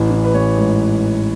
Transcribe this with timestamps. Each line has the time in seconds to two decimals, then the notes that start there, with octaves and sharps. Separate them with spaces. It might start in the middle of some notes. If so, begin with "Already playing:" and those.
Already playing: A1 E3
0.10 E3
0.24 B4
0.34 A1 C#5
0.57 G#2